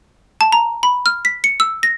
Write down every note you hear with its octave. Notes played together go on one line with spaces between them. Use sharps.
A5
A#5
B5
F6
B6
C#7
E6
A#6